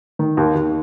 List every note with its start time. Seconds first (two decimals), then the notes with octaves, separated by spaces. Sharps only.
0.19 D#3
0.37 D#2
0.55 D#2